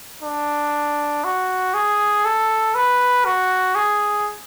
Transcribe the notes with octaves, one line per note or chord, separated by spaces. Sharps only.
D4
F#4
G#4
A4
B4
F#4
G#4